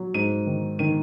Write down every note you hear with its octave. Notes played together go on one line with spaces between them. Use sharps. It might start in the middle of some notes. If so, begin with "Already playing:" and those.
Already playing: F#3
G#2 D#7
D#3
D#3 D#7